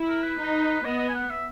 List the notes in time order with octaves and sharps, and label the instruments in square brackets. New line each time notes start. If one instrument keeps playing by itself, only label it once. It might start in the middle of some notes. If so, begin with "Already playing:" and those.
Already playing: [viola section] E4
[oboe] A#4
B4
[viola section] D#4
[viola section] B3 [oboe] D#5
[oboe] D#5
G#5
F#5
E5